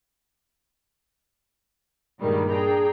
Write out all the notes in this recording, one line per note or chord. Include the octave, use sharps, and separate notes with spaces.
G2 A#2 D#3 G3 G#3 A#3
D4 G#4 G5 A#5